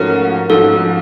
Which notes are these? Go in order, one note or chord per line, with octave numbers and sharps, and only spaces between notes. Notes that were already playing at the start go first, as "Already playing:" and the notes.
Already playing: G#2 F3 A3 C#4 F#4 A#4
G#2 F3 A3 C#4 F#4 A4